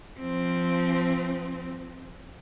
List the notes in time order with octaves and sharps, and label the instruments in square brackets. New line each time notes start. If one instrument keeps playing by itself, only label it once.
[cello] F3 C4